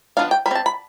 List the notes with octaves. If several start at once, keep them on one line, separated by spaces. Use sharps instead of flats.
F3 B3 D4 F5
G5
G3 B5
C4 A5
B5